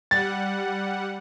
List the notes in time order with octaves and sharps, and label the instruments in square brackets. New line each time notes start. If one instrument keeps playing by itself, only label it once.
[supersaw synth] G3 F#5 [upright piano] A6